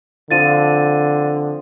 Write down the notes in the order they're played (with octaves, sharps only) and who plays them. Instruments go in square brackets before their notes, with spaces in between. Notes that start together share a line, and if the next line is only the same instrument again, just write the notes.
[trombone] D3 [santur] F3 C4 [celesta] A6 D#7